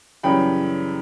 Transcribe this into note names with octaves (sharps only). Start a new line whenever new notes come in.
F#2 C#3 E3 G3 G5 B5